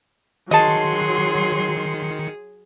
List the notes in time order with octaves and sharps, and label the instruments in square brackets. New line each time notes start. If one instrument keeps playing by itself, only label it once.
[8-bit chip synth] D#3 C#7 [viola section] F#3 C6 [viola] G#4 [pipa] D#5 A5